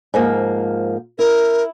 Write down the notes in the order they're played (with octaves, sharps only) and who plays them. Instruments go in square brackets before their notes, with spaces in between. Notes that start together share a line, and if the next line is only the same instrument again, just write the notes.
[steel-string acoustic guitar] G#2 F3 A#3
[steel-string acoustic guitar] E4 [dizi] A#4